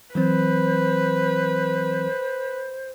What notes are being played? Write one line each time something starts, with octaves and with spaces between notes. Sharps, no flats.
E3 F#3 C4 B4 C5